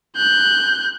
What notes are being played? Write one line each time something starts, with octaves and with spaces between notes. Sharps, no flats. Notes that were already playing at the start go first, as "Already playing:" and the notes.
F#6 G6